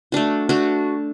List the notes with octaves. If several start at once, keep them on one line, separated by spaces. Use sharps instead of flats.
A3 D4 F#4
A3 D4 F#4